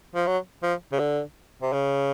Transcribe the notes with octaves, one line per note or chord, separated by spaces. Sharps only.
F3
F#3
F3
C#3
D3
C3
C#3